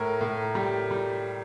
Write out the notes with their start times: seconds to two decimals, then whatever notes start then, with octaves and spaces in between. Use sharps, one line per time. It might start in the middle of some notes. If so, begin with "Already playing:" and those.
Already playing: A2 A#4
0.21 A2
0.55 G3
0.91 G3